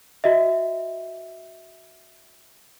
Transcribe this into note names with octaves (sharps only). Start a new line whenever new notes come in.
F#4 D#5 E5